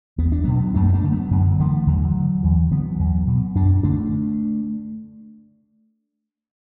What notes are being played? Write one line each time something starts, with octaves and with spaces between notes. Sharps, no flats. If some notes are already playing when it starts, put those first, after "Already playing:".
E2 B3
D4
B2 F#3 B3
F#2 A3 D4
B3
A3 D4
D3 A3
F#3 B3
F#2 D3 F#3
D3 E3 A3
E2 D3 F#3
D3
E2 E3
D3 F#3 B3
E2
B2
F#2 D4
D3 A3 D4